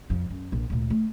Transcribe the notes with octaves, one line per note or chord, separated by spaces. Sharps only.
F2 F3
F#2
A#1
D2 A#2
A3